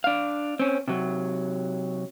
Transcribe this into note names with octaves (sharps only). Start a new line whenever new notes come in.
D4 F5
C4 C#4
C3 F#3